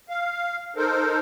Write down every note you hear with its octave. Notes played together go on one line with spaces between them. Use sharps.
F5
D#4 A4 A#4 C5